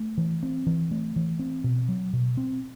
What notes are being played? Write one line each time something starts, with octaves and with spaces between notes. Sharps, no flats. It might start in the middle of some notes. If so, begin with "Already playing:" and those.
Already playing: A3
E3
C4
E3
A3
E3
C4
B2
F#3
B2
C4